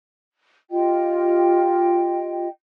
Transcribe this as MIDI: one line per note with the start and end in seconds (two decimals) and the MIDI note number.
0.71 2.47 65
0.71 2.47 67
0.71 2.47 75
0.71 2.47 79